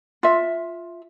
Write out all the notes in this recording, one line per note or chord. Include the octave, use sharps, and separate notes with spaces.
F4 E5